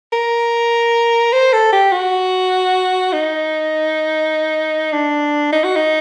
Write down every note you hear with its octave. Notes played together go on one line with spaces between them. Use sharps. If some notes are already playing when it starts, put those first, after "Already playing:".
A#4
C5
A4
G4
F#4
D#4
D4
D#4
F#4
D#4